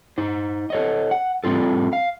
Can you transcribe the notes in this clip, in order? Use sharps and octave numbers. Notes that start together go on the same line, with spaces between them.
D#4 C5
A4 C#5 D#5
F#5
G3 C4 F4 A4
F5